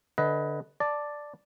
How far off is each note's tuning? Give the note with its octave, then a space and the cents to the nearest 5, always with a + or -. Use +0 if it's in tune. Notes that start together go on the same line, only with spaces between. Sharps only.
D3 +0 B4 +0 D#5 +25
D5 +0 A5 +0